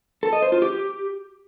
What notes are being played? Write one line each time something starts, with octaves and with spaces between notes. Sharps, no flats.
A4
D#5
C5
F4
G4